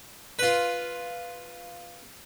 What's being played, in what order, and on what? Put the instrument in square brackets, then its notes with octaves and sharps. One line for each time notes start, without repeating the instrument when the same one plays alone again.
[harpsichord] F4 B4